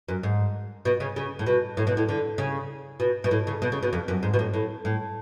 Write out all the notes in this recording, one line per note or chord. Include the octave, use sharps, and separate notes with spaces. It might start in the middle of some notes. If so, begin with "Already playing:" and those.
F#2
G#2
B2
C#3
C#3
A2
B2
A2
B2
A2
D3
C#3
B2
B2
A2
C#3
B2
C#3
B2
F2
F#2
G#2
B2
A2
A2
A2